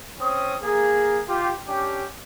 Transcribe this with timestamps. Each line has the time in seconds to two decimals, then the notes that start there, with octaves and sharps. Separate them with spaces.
0.20 C4 C#4 D#6
0.62 A#3 G#4
1.28 F4 G4
1.68 C#4 D4 G4